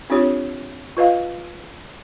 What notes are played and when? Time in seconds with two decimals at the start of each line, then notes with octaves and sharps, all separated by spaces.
0.10 C4 D4 F4 G4 C#5
0.97 F4 B4 D#5 F5